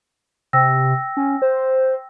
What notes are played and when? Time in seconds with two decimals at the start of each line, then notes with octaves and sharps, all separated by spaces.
0.53 C3 G5 E6 A#6
1.17 C#4
1.42 C5